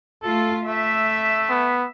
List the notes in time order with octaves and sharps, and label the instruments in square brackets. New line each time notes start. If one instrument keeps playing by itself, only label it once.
[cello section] A3 F4 [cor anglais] A4
[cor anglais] A3 [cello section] E5
[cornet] B3